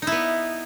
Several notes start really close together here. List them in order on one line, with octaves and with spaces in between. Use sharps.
D#4 E4 B3